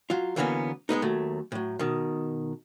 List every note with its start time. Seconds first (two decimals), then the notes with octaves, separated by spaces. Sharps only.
0.10 F#3 F4
0.36 D3 E3 F#3 A#3 B3 C#4
0.89 G#3 A#3 B3 D#4
1.02 D#2 F#3 A3
1.52 A2 F#3
1.79 B2 D#3